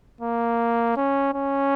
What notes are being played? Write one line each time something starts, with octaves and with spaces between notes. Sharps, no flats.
A#3
C#4
C#4